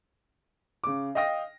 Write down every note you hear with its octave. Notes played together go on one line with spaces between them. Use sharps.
C#3 D6
D#5 F5 G5 D#6 A#6